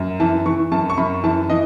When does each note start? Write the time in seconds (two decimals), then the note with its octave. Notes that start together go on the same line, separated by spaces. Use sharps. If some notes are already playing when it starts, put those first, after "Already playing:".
Already playing: F#2
0.20 E3 A5
0.46 E3 C#6
0.72 F#2 A5
0.90 C#6
0.98 F#2 B5
1.24 E3 A5
1.49 E3 D#5